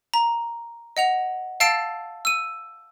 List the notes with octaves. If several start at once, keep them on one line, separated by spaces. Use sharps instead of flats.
A#5
D#5 F#5 F7
F5 A5 E6 A6 C7 D7
E6 D#7